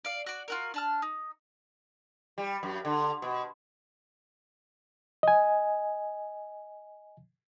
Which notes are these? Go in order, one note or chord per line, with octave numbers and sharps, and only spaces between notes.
D5 F5
F#4 D5
F4 F#4 A#4
D4 A5 F6
D#4
G3
F#2
D3
B2
D#5 G#5